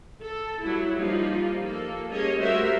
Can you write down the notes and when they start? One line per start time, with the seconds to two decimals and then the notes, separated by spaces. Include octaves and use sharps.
0.21 A4
0.61 F#3 G3 E4
0.99 F3 G3 A#3 D#4 F4
1.60 A#3 A4
2.10 G3 A#3 C#4 G#4 C#5 D#5
2.40 G3 A3 F#4 A#4 C5 E5